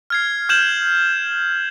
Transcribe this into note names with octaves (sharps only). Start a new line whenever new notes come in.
F6 G#6 C7
F6 G6 G#6 E7 F#7